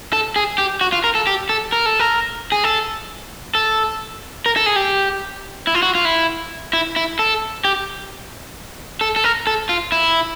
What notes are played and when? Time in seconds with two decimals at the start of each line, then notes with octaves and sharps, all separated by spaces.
0.13 A4
0.36 G#4
0.58 G4
0.81 F#4
0.92 F4
1.04 A#4
1.15 A4
1.27 G4
1.49 A4
1.72 A#4
1.86 A4
2.00 A#4
2.52 G#4
2.64 A4
3.55 A4
4.46 A#4
4.56 A4
4.66 G#4
4.76 G4
5.67 E4
5.75 F4
5.83 F#4
5.95 F4
6.05 E4
6.73 E4
6.96 E4
7.19 A4
7.65 G4
9.01 A4
9.16 A4
9.24 A#4
9.47 A4
9.69 F4
9.92 E4